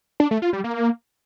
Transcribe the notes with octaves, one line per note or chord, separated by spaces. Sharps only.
D4
A3
F4
G3
A#3